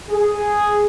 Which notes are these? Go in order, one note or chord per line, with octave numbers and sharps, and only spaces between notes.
G#4